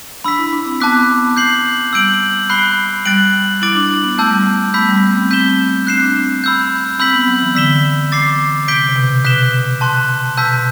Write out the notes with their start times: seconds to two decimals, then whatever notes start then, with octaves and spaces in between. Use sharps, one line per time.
0.24 D4 B5 E6 B6
0.39 E4
0.53 D4
0.66 C4
0.80 B3 A5 D6 F#6 B6
1.37 G6 C7 F#7
1.93 G3 E6 G6 D7 F#7
2.50 B5 F#6 C7 G7
3.05 G3 F#6 A6 D7 F#7
3.62 E4 D6 A6 D7 F#7
3.75 D4
4.03 B3
4.18 A3 A5 E6 G6
4.30 G3
4.43 A3
4.69 B3
4.74 A3 B5 E6 G6 B6
4.88 G3
5.02 A3
5.17 C4
5.31 C4 G6 B6 E7 G7
5.87 D4 F#6 C7 E7
5.95 C4
6.02 D4
6.44 B5 E6 G6
6.99 C4 B5 E6 G6 B6 F#7
7.13 B3
7.28 F#3
7.42 E3
7.55 D3 E6 B6 E7 G7
8.12 D6 A6 C7
8.68 C3 G6 B6 D7 G7
8.89 C3
8.96 B2
9.24 B2 F#6 B6 E7 G7
9.81 A5 C6 F#6
10.37 B2 A5 E6 G6 B6
10.52 B2